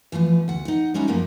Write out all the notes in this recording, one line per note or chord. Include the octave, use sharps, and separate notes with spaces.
E3 F3 A3 B3
D2 F#5
D#4 F#5
G3 G#3 C#4 D#4 E4 F#4
F#2 F3 F#3 A3 A#3